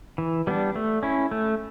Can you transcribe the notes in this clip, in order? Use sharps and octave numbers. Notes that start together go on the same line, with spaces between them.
E3
G3 B3 D4
A3
C#4 E4
A3